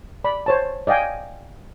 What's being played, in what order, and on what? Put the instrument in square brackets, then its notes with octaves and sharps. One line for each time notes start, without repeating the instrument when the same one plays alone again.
[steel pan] D5 B5
C5 C#5 A5
D5 D#5 F5 G5 G#5